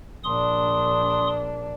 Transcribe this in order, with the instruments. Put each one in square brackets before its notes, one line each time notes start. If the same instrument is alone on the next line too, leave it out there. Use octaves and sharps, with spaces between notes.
[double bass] A#1 D4 [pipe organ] C6 D#6